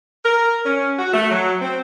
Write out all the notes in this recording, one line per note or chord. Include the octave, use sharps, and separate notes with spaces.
A#4
C#4
F#4
A3
F#3
C4